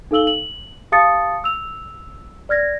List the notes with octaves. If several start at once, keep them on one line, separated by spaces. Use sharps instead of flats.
D#4 A4 F5 E6 F#7 G7
F#7
G4 F5 A5 D#6 A6 C#7
E6 F7
D5 F6 G#6 A#6